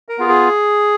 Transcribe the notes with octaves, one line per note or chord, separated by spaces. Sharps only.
A#4
B3 F4 G#4
G#4